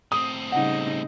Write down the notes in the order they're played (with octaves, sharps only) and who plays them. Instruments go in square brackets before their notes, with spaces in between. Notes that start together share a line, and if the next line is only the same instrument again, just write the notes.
[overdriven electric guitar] A2 C4 [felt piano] D#6
[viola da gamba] C#3 G3 D#4 [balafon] F#5